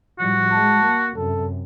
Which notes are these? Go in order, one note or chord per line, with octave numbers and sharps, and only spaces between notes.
A2 F3 G3 F#4
G#3 A5
A#3
F#2 C3 A4